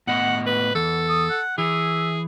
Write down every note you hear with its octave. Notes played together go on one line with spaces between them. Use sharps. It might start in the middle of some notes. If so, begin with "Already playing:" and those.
A2 B3 D#5 F#5
B4
E2 A4
D#6
F#5
E3 G#4 E5